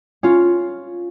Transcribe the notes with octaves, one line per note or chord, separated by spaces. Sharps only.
C#4 F4